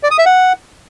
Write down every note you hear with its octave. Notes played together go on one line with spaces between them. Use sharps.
D5
D#6
E5
F#5